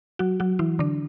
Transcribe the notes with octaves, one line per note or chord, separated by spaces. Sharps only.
F#3 F#4
F#3 F#4
E3 E4
D3 D4